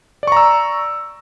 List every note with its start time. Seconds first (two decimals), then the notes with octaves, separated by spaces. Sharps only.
0.23 D5
0.27 C#6
0.32 A#5
0.37 E6